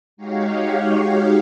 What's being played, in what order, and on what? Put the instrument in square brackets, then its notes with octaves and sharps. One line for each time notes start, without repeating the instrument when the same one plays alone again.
[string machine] G#3 D#4 F#4 G4 C#5 F5